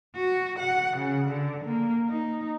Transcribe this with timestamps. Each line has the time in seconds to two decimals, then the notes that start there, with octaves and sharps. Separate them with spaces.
0.16 F#4
0.59 F#5
0.98 C#3
1.28 D3
1.65 A#3
2.09 D#4